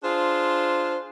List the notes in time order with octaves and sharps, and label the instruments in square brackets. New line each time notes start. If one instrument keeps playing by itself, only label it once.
[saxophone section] D4 F4 G#4 C5